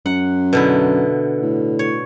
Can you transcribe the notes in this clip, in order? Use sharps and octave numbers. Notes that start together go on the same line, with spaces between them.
F#2 F#5
B2 D3 E4
A2
C#5